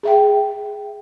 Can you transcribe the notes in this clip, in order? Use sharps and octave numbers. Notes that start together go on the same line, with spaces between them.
G#4 E5 G5